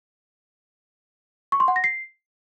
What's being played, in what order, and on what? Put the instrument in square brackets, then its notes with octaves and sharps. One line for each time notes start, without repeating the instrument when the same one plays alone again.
[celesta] C#6
C6
F#5
A#6
C7